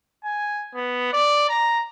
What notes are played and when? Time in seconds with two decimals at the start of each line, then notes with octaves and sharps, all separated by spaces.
0.24 G#5
0.75 B3
1.13 D5
1.49 A#5